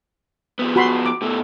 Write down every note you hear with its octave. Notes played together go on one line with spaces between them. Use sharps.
F3 B3
F#4 B5 C6
D6
B2 A3